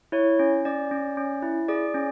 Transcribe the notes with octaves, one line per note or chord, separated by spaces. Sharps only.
E4 C#5
C#4
C#4 D5
C#4
C#4
E4
G#4 D5
C#4